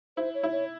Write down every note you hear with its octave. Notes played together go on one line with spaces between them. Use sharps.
E4 C5
C#5
E4
C#5